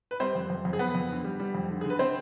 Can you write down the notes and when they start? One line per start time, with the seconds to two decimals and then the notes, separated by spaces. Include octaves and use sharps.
0.11 B4
0.20 G3 C4 C5
0.35 F2
0.50 F2
0.65 F2
0.73 G#4
0.79 F2 B3 B4
0.95 F2
1.09 D3
1.24 G3
1.40 G3
1.55 F2
1.69 D3
1.81 D3 G#4
1.90 B4
1.99 C4 C5